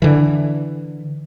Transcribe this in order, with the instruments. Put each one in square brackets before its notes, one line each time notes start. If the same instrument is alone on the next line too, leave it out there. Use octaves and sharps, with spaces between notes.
[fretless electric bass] D3 E3